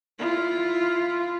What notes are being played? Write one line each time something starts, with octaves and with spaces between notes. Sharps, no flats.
E4 F4